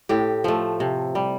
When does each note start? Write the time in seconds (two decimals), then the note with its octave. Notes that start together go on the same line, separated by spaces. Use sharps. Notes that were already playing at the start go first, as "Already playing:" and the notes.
0.09 A2 G4
0.44 F3 A3
0.80 C3
1.15 G3